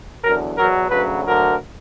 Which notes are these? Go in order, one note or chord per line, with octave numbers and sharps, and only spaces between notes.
E2 D3 F#3 A#4
E2 B2 F#3 A#4
D2 C#3 F#3 B4
D2 D3 F#3 A#4